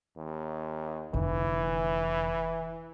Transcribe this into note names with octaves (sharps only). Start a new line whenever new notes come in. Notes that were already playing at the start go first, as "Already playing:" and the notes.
D#2
F1 D3 E3